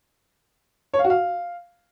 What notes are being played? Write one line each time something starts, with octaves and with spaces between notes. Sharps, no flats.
C#5
F5
F#4
F5